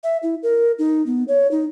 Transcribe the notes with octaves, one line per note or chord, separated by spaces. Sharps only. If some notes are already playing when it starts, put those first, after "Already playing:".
E5
E4
A#4
D#4
B3
C#5
D#4